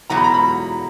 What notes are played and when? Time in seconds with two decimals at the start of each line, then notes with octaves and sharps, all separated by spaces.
0.10 E2 B2 F#3 A#5
0.17 B5
0.24 A#5
0.34 B5